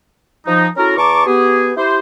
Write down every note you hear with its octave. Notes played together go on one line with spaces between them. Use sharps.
F3 D#4
C#4 E4 F#4 A4 A#4
E2 A5 A#5 C#6 D6
B3 G4 G#4
E4 G4 C5